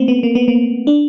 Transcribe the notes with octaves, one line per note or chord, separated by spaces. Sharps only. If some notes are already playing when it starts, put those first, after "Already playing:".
Already playing: A3 A#3 C4
B3
A#3
B3
A#3
D4